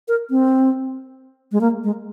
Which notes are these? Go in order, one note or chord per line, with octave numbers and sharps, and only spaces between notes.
A#4
C4
G#3
A#3
G#3